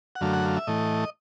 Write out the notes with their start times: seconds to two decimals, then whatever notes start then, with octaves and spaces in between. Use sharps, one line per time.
0.16 F#5
0.21 F#2 D3 F#3 A3 F5
0.33 F#5
0.45 F5
0.56 E5
0.67 A2 E3 A3 D#5